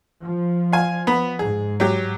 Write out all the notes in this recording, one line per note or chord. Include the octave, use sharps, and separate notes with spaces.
F3
F5 G#5
B3 B5
G#2 G#4
F#3 G4